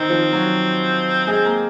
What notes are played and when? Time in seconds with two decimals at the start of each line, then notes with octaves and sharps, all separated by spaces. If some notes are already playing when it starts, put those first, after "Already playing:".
Already playing: D#3 C4 D#4
0.09 F3 F4
0.33 F#3 F#4
1.27 G#3 G#4
1.45 A#3 A#4